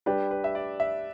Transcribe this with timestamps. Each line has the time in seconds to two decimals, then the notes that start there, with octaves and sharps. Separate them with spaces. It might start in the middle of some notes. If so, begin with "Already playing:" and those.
0.06 G3 D4 G4 B4
0.31 B4
0.44 E5
0.55 D5
0.80 E5